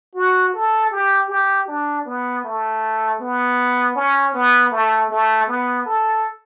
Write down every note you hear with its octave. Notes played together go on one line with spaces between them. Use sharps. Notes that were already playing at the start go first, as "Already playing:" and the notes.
F#4
A4
G4
G4
D4
B3
A3
B3
C#4
B3
A3
A3
B3
A4